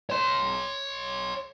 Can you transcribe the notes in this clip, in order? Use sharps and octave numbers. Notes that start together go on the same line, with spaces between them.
C#5 C6